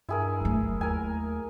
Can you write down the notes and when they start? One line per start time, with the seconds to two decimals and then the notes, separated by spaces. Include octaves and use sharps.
0.09 G2 E4 G#4 A#4
0.41 F#3 A3
0.62 G1
0.81 D#2 A#4 G#5